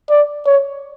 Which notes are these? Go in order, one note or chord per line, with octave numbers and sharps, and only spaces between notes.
D5
C#5